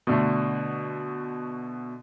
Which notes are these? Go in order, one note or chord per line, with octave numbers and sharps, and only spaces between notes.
B2 D3 A3